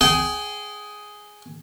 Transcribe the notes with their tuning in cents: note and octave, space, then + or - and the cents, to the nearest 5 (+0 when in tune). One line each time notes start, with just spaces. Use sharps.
G#4 +5 G5 -30